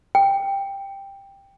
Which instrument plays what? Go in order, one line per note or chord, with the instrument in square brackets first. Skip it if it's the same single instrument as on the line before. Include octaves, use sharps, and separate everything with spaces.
[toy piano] G5